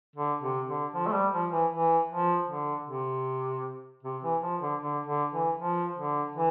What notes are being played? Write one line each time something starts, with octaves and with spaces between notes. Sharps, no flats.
D3
C3
D3
F3
A3
G3
F3
E3
E3
F3
D3
C3
C3
E3
F3
D3
D3
D3
E3
F3
D3
E3